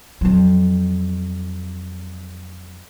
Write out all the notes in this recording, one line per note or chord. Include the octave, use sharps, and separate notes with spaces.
F2 F#3